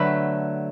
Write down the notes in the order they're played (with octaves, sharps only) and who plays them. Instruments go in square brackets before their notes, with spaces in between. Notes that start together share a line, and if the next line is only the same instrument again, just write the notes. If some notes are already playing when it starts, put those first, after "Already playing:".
Already playing: [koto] D3 F#3 A3 B4